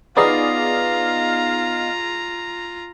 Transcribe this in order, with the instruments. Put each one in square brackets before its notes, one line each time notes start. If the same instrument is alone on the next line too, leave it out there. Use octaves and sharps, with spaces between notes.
[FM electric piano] B3 D#4 D#5 [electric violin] F4 A#5 [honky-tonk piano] G#4 D5 [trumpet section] F5